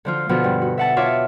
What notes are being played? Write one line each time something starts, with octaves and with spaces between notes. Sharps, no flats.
D3 F3 F4
B2 D3 F3
G2
F#4
E5 F#5 A5
F4 C#5 E5 F5 C#6 D6